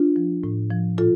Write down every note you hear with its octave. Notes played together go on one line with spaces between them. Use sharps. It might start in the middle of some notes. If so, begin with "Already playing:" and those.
Already playing: D4 F4
F3
A2
F3
A#2 F4 A4